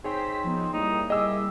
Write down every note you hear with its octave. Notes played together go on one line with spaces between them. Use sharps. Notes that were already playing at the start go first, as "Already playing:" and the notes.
C4 D#4 G#4 C5 C#5 G5 B6
F3 B3 D#4
G3 A#3 D#4 E4
G4 G#4 D#5 E6